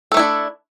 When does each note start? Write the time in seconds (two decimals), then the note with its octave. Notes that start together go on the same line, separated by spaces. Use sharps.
0.12 A4
0.14 A3
0.17 E4
0.19 D4